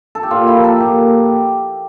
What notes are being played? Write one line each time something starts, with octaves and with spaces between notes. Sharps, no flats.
A4
G4
A#2 F4
E4
F3 A#3
A4
A#2 G4